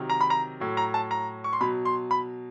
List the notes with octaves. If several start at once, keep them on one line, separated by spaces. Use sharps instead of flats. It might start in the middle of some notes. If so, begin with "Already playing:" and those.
Already playing: C3 D#3 F#3
A#5
B5
A#5
A2 F#3
A#5
A5
A#5
C#6
C6
B2 F#3 B5
C6
B5